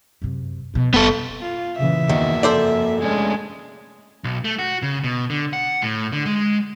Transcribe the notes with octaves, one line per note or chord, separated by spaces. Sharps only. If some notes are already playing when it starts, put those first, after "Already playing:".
F#2 C3
B2 F3
F1 B3 A4
F4
A#2 C#3 E3 E5
E2 D#3 A#3 F#4
F2 A4 C5 D5
G#3 A3 C#4 D4
B1
A3
F#4
C#3
B2
D3
F#5
A2
D3
G#3